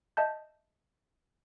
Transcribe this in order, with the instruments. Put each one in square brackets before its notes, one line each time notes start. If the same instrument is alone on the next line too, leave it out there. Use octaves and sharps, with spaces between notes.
[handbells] D#5 E5 A5 G6